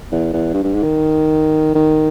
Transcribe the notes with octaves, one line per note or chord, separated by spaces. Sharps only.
E2
E2
G2
G2
G#2
D#3
D#3